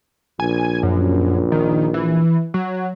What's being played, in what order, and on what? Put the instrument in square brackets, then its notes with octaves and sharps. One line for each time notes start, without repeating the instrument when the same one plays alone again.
[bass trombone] A#1 [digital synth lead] G#5
[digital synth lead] F#2
D#3
E3
F#3